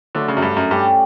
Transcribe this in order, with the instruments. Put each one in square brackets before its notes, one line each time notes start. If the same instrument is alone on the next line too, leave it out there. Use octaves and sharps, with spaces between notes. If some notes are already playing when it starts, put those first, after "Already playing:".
[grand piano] D3 [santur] F#3 A3 D4 A4
[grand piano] C#3
F#2
G2
F#2
[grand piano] G2 [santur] C#4 G4 D5